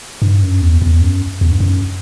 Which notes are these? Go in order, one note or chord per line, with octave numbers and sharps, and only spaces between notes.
G2
F#2
E2
E2
F#2
E2
G2
F#2